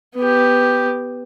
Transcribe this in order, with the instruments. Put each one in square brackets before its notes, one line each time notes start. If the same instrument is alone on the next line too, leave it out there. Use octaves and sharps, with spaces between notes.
[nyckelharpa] B3 G4